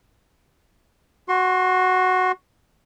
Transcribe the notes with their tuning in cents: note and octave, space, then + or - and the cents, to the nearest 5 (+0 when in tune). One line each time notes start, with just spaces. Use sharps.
F#4 +0 C6 +35